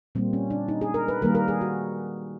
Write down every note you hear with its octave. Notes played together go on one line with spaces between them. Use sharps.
A#2 G3 A#3 C4
C#4
D4
D#4
G#4
A#4
B4
D#3 G3 A#3 A#4
A#4
G#4
F#4